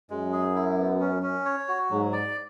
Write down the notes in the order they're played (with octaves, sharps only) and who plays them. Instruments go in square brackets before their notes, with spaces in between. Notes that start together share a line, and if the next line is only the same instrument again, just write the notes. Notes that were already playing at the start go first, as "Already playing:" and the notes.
[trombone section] F#2 [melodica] G#3
[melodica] G#4
E4
B3
C#4
C#4
C#5
F#4
[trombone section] G#2 [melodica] F#3
[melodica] D5